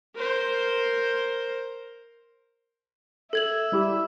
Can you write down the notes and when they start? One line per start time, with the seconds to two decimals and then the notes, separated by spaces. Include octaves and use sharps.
0.16 A#4 C5
3.33 A4 E5 G#6 F#7
3.72 G3 E4 G4